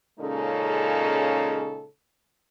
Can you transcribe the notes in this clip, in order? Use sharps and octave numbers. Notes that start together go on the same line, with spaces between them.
A#2 C#3 G#3 C#4 D#4 A4